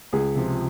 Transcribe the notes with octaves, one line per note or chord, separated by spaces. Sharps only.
C#2 G#4
C3 F3